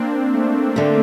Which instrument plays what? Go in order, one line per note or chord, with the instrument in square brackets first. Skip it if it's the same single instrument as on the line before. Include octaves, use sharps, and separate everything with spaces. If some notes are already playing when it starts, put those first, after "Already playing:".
Already playing: [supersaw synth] A#3 C4 D4
A3
[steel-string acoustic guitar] D3 A3